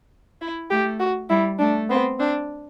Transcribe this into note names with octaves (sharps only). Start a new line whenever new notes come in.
E4
A3 G4
F#4
G3 E4
A3 D4
B3 C4
C4 D4